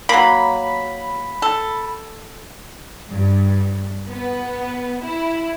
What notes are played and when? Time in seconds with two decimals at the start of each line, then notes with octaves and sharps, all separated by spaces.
0.09 F#3 A#3 B5
1.42 A4
3.08 G2
4.08 B3
5.03 E4